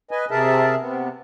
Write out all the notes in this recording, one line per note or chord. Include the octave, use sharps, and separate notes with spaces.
B4 D#5 G#5
C3 G#4 A#4 E5 A5
C3 B3